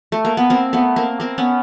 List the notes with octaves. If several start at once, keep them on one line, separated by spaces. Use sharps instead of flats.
A3
A#3
B3
A#3 C4
A3 B3
A#3 C4
A#3 C4
B3 C#4